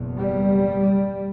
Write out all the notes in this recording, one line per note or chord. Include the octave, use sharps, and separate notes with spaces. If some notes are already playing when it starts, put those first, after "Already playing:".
Already playing: F#1 E2 B2
G3